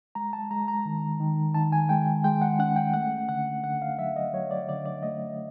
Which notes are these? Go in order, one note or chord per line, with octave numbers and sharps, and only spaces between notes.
G#3 A#5
A5
G#3 A#5
A#5
D#3
D#3
D#3 A5
G#5
G#3 G5
G#3 G5
F#5
C#4 F#5
G5
A3 F#5
D3 F#5
D3 F#5
F5
F#3 E5
D#5
F#3 C#5
D5
D3 D5
D5
A3 D#5